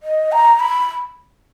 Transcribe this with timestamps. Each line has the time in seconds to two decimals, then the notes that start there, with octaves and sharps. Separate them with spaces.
0.03 D#5
0.32 A#5
0.60 B5